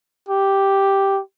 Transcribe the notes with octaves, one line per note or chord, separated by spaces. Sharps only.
G4